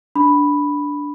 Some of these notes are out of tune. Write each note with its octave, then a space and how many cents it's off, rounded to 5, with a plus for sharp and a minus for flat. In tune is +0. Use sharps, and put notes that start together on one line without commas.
D4 -10 B5 +0